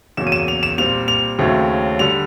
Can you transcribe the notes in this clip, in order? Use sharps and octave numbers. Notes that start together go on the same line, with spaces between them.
E2 C#3 F#3 A#3 E7
D#7
E7
F7
E7
A#2 G3 C4 F7
F7
D#2 C#3 F#3 A3 C4
D3 G3 F7